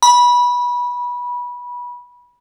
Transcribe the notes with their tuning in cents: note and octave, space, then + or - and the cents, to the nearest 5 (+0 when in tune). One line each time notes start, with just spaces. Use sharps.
B5 -20